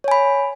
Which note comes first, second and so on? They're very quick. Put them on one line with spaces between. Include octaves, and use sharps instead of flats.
C#5 G#5 B5